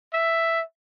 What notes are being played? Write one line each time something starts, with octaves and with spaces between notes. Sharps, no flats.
E5